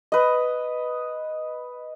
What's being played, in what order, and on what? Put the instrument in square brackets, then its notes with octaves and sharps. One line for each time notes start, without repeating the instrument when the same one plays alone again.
[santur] B4 D#5